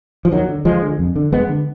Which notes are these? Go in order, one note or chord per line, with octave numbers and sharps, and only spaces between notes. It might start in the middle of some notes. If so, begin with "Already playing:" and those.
F3
D#2 D#3 F#3
D3
D#2 F3 G#3
D3
F2
D3
F2 G#3 B3
D3